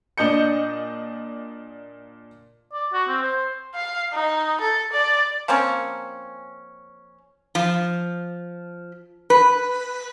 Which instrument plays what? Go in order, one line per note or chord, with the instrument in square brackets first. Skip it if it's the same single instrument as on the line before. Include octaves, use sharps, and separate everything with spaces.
[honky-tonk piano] A#2 D4 D#5 G6 C#7
[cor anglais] D5
F#4
C4
C5
[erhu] F5
D#4
A4
D5
[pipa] F3 A#3 C4 C#4
[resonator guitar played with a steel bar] F3
B4